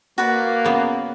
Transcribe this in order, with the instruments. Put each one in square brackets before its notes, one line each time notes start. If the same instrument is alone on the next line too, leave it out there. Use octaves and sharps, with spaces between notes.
[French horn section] A#3 [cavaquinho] F#4 B4 D5
[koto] C#3 B3